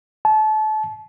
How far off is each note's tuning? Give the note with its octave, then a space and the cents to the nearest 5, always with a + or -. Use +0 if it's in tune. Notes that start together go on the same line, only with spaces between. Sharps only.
A5 -30